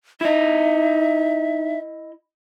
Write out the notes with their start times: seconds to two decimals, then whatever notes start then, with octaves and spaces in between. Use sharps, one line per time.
0.21 D#4 E4 D#5 E5